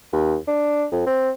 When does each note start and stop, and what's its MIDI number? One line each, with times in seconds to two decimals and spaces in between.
0.13 0.35 39
0.48 0.85 62
0.92 1.03 41
1.06 1.30 60